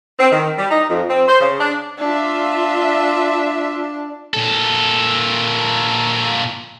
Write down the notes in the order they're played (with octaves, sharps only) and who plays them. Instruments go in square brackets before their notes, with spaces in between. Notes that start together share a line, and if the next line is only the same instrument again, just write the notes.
[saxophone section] C4
D#3
G3
D#4
F2
C4
C5
C#3
D4
[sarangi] D4 [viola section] F4 E5
[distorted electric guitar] A#2 A4